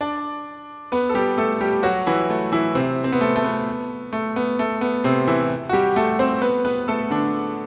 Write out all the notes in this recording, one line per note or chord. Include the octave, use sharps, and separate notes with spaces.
D4 D5
B3 B4
A4
G3 G4
A3 A4
G3 G4
F#3 F#4
E3 E4
A3
E3 E4
C3 C4
C4
B3
A3
A3
B3
A3
B3
A3
B3
C3 C4
E3 E4
F#4
G3 G4
A3 A4
C4 C5
B3 B4
B3 B4
A3 A4
D3 D4